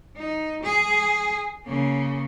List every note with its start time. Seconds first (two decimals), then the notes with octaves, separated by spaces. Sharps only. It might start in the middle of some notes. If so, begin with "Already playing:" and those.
0.16 D#4
0.63 G#4
1.66 C#3 A#3